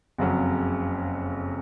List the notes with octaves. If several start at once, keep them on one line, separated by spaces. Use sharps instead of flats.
F#1 F2 C#3 F#3